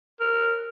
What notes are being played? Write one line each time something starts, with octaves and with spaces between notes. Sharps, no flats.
A#4